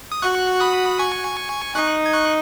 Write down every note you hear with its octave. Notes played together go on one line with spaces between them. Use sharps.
D#6
F#4 C#6 F#6
B5 D#6
G#5 C#6
D#4 C#6 F#6
G#6
C#6 F#6